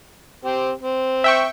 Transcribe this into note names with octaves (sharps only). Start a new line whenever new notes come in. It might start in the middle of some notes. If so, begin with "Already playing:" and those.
C4 G4
C4
E5 G5 C#6